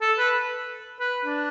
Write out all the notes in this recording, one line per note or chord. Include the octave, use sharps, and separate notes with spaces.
A4
B4
B4
D4